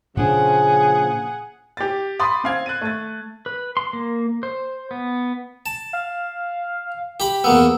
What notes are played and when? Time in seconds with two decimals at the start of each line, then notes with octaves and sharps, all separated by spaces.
0.17 A#2 C#3 F3 D4 G#4 F#5
1.77 G4 A6
2.20 B5 C6 D6 D#6 A6
2.44 C4 F5 G#6
2.66 F#6 A6 D#7
2.81 A3 A6
3.46 B4
3.77 C6
3.93 A#3
4.43 C5
4.91 B3
5.66 A5
5.93 F5
7.20 G4 B5
7.44 E2 A#3 B3 E6